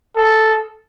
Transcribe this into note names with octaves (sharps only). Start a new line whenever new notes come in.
A4